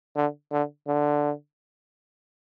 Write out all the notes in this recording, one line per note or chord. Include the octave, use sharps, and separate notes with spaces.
D3
D3
D3